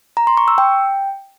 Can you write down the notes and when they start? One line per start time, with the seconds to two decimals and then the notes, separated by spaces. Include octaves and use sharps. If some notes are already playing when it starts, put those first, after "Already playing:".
0.17 A#5
0.27 C6
0.37 C#6
0.48 E6
0.58 G5